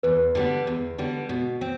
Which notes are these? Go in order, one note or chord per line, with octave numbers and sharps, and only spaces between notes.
E2 B4
D3 G3 B3
E2
D3 G3 B3
B2
C4